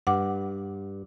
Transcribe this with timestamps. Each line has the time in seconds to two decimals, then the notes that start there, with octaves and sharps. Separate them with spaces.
0.07 G2 F#5 D6